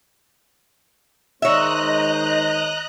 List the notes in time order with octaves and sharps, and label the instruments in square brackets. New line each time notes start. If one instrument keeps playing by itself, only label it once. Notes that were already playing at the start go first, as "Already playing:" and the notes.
[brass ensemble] D#3 G#3 C5 [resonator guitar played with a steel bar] C#5 E5 [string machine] D#5 A#5 F#6